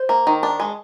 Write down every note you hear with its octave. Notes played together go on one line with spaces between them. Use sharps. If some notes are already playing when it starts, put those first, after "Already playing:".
Already playing: C5
A#3
D#3
D4
G#3